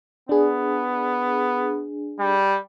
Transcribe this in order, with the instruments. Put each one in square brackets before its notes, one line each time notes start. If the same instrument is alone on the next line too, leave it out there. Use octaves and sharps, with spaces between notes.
[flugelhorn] B3 [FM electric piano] D4 G#4
[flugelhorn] G3